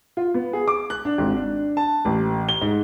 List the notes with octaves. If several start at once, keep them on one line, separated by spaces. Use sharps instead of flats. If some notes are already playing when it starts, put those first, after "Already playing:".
F4
B3
G#4
D6
F#6
D4
G#1
D4
A5
A1
G7
G#2